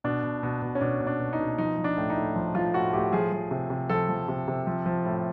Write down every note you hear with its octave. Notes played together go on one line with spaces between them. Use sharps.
B2 D4
B2
B2
B2
C#4
B2 D4
B2
D4
B2
D#4
B2
F3 D#4
F3
D4
A2
D#4
A2
F3
F3 F4
A2 F#4
A2 G4
F3 G#4
F3
C3
C3
F3 A4
F3
C3
C3
F3
F3
A2